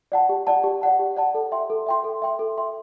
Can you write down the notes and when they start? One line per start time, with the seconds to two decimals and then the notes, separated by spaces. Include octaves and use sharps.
0.12 D5 F#5 A5
0.29 G4
0.47 D5 F#5 A5
0.64 G4
0.82 D5 F#5 A5
0.99 G4
1.17 D5 F#5 A5
1.34 A4
1.52 E5 G5 C6
1.70 A4
1.86 E5 G5 C6
2.04 A4
2.22 E5 G5 C6
2.39 A4
2.58 E5 G5 C6